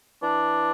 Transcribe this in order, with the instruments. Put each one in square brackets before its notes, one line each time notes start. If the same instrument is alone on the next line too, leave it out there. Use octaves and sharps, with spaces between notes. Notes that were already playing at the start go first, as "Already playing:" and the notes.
[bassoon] E3 [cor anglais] D4